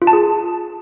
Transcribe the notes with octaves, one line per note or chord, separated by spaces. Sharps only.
F4
A5
G#4